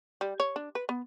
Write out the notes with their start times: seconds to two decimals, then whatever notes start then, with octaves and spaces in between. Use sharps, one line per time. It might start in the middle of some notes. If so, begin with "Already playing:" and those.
0.21 G3
0.40 C#5
0.56 D4
0.75 B4
0.89 B3